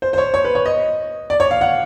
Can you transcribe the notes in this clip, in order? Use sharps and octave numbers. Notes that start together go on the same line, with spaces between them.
C5
C5
C#5
C#5
B4
C#5
D#5
D5
C#5
F5
F#5